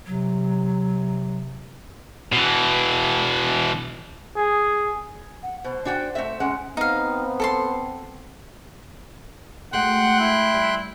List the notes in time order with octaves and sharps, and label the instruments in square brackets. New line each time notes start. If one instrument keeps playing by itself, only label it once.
[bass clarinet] C3 [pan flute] F#3
[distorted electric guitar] B2 E3
[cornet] G#4
[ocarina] F#5
[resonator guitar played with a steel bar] B2 [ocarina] C5
[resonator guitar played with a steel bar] D4 F#4 G5
A3 C4 E5
G#3 C#4 F#5
[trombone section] B3 C4 [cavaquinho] D#4 F5
[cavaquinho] A4 A5 C6
[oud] G#3 A3 F#4 [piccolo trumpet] F#5 [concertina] G5 C6 F#6
[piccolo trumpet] E4
[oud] G3